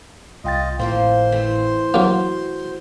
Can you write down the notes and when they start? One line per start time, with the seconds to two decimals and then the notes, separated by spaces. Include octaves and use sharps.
0.44 C2 F4 D#5 G5 A6
0.79 G#1 A2 F3 A#3 C4 C5 F5 C6
1.32 E3 A3 C4
1.94 F#3 A#3 F#4